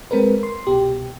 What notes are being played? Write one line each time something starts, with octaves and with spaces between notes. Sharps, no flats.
G#3 C4 A#4 B4
C6
C2 B2 G4